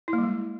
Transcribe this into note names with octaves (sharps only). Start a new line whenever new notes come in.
E4
A#3
G3
G#3